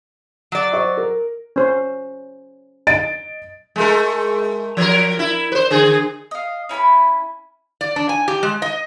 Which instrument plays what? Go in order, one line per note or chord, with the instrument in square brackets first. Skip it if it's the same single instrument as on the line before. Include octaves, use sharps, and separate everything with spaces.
[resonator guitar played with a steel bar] F#3 D5
[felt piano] C5 D#5 C#6
A#4
[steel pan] C#4 C5
[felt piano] D#5 A6 D7
[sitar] G#3 A3 A#4
F3 A#4
E4
B4 C5
D3 G#4
[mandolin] D#5 F5
C#4 E4 G#5 B5
[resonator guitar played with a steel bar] D5
D4
G#5
G4
G#3
D#5